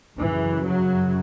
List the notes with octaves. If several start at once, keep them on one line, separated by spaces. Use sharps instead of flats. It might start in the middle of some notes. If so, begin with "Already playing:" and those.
F#2 C#3 E3
F#3